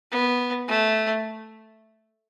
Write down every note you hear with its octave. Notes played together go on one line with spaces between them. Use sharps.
B3
A3